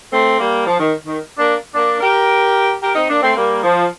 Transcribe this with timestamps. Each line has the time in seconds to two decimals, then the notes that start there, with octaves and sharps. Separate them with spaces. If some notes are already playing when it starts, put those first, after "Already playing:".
0.12 A3 C4
0.40 G3 A#3
0.66 F3
0.80 D#3
1.06 D#3
1.38 A#3 D4
1.74 A#3 D4
2.01 G4 A#4
2.82 G4 A#4
2.95 C4 D#4
3.09 A#3 D4
3.22 A3 C4
3.35 G3 A#3
3.63 F3